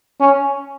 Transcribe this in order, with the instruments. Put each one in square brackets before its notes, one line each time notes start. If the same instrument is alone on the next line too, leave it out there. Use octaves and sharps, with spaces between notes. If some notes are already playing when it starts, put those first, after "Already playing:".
[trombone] C#4